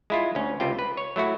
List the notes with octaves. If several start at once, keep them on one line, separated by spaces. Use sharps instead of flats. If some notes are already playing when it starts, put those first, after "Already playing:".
G#3 E4 F4
D2 C#4
C#2 C3 F4 G5
B4
C#5
F#3 A3 E4 F#4